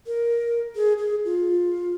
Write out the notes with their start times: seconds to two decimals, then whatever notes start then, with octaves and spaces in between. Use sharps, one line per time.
0.07 A#4
0.76 G#4
0.98 G#4
1.25 F4